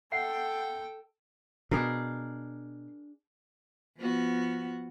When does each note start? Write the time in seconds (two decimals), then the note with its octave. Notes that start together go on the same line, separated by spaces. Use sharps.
0.12 A4 E5 F#5 G5 C7
1.71 B2 D4 G#4 A#4
3.97 F3 B3 F#4